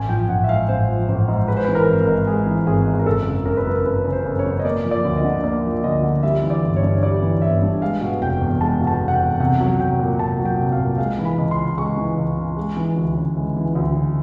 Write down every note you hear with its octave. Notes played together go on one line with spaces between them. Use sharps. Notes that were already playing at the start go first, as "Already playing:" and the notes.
Already playing: A1 G#5
F3 G5
A1 F#5
E5
G#2 F5
A1 C5
F3
A1 C5
G#2
G#3 B4
C5
B4
E3
A#4
G#1
A#4
G#2
G#3 G#4
E3
G#1 G#4
G#2
A#4
F#1 A4
C#3
F#1 A#4
B4
F#2 A#4
F#1 B4
C#3
C5
F#1
C#5
F#2
D#5
A#3 D5
F3
D5
D2
D#5
D3
A#3 D5
F3
D2 D#5
D3
G3 E5
E3
D5
G1
C#5
G2
G3 D5
E3
G1 E5
G2
G#3 F5
B2
F1 G5
E2
G#3 A5
B2
A5
F1
F#5
G5
E2
C2 F#5
F#3
C2 G5
A#2
C2 A5
F#3
G5
C2
F5
A#2
G#3 F5
E3
B5
C#2
C6
C#3
G#3 C#6
E3
C#2
C#3
G#3
E3
D2
C#3
G#3
E3
D2
C#3